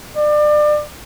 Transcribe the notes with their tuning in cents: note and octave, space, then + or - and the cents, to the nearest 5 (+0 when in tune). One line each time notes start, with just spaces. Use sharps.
D5 +30